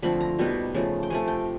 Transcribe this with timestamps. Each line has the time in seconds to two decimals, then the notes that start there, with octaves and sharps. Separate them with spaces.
0.03 D3 F3 A3 C4 B5
0.21 A#5
0.39 B2 G3 B3 D#4
0.75 C#3 F3 A3
1.03 G5
1.10 C3 F3 A3 G#5
1.28 G5